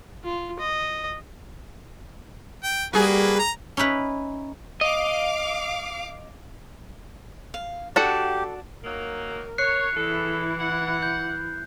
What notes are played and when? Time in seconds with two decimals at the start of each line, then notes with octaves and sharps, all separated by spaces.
0.24 F4
0.59 D#5
2.64 G5
2.93 G3 A#3 F#4 G#4 B4
3.39 A#5
3.77 C#4 D#4 E4 B4
4.81 D#5 F5 D6
7.54 F5
7.96 D4 F#4 G4 A4 F#5
8.84 D#3 F#3 A#3 A#4
9.58 C#5 F#6 C7 C#7
9.97 E2 E3 E4 A4
10.58 F#5
11.02 G6